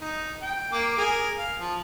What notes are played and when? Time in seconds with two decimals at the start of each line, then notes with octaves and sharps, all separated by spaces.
0.01 D#4
0.42 G5
0.72 A#3 D6
0.98 G#4 A#4 G#5
1.39 F5
1.60 F3